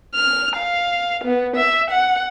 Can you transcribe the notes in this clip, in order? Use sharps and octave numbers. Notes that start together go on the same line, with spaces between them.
F6
F5
B3
E5
F#5